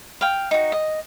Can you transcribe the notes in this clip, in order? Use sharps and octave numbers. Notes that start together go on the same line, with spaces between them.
F5 G5
D#4 F#4
D#5